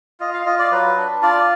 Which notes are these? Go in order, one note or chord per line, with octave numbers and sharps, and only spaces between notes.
F4 D#5
F5
F4 D#5
D5
F#3 B4
D4
F4 D5